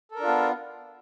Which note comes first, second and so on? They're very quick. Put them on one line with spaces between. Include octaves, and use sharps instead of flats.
A4 A#4 D4 F4 B3